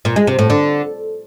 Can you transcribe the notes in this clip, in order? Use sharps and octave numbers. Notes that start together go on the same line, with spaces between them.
A#2
G#3
C3
A2
D3